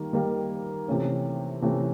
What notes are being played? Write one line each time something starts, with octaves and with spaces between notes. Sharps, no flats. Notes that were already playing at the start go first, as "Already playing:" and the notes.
Already playing: D#3 G3 A#3
D#3 G3 A#3
C3 E3 A3 C#4
C3 E3 A3 C#4